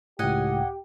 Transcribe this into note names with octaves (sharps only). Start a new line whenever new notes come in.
C#2 A2 G4 D#5 F#5 G#5